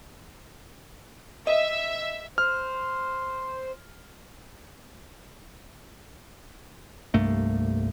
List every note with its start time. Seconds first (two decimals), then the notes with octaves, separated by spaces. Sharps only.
1.47 D#5 E5
2.38 C5 F6
7.14 C2 G2 A3 A#3